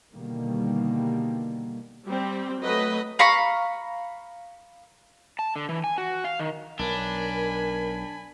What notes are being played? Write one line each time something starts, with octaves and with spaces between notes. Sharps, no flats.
B2 D3 D#3 G3 A#3
G3 C4
F#3 A3 B4 D#5
F5 A#5 B5 C#6
A5
D3
E3
G#5
F#4
F5
D#3
B1 D4 A#4 G#5 B5